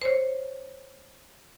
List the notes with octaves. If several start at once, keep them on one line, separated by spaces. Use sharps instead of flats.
C5 C#5